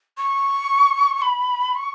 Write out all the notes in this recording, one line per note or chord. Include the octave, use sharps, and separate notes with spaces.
C#6
B5
C#6